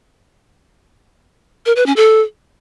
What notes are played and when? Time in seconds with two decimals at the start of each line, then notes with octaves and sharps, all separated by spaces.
1.66 A#4
1.76 B4
1.86 C#4
1.96 A4